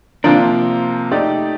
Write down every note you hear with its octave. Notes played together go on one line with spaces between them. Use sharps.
C3 F3 A#3 D4 F4 A#4
A3 D#4 G4 D5